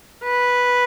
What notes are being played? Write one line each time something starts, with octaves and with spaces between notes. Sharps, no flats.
B4